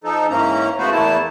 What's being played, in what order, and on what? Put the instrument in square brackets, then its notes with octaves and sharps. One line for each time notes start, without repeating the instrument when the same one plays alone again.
[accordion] F3 D#4 A4
G#2 E3 A#3 C#4 A#5
C#3 A3 B3 F#4 B4 C5
E2 A3 A#3 E4 A5